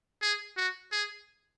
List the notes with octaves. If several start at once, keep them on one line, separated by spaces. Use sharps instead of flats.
G#4
F#4
G#4